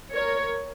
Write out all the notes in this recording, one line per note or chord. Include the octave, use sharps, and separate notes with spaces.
A#4 C#5